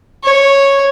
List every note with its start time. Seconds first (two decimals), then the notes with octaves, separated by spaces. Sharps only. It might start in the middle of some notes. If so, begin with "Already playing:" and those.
0.24 C#5